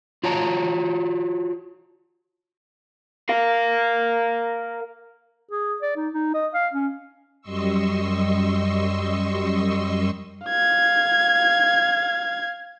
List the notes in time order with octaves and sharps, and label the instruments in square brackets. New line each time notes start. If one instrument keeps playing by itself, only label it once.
[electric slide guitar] F4 F#4 C#5 A5 A#5
[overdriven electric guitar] A#4 F5
[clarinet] G#4
D5
D#4
D#4
D#5
F5
C#4
[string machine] F#2 G3 D#5 C6 C#6 E6
[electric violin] F5 G#6